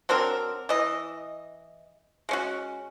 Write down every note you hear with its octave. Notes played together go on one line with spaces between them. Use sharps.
F#3 C4 D4 A#4
E3 D#5
G#3 C#4 F#4